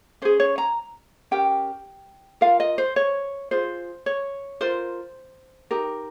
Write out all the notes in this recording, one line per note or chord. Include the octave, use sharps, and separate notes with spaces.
C#4 G#4 C5
C#5
A#5
C#4 G4 A#4 G5
F4 A#4 F5
D#5
C5
C#5
F4 G#4 C5
C#5
F4 A#4 C5
D#4 G4 A#4